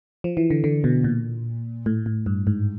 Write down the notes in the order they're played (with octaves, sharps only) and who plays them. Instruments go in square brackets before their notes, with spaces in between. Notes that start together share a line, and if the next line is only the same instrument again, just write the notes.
[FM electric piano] F3
E3
D3
D3
B2
A#2
A2
A2
G2
G#2